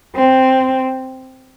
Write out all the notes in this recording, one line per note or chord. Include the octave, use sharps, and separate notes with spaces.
C4